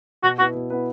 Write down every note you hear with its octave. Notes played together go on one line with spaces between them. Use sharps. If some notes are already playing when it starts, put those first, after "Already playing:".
B2 F#4
B3 E4 F#4 B4
B2
B3 E4 B4